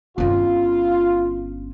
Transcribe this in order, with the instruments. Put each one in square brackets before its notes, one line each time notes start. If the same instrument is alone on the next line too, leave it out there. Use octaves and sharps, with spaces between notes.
[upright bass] G1 C#4 [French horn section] F4